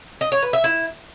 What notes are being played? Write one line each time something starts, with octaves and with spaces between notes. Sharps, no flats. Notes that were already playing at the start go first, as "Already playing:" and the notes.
D#5
C#5
B4
E5
E4